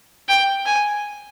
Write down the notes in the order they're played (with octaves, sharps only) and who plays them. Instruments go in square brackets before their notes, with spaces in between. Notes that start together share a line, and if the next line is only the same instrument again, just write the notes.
[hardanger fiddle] G5
G#5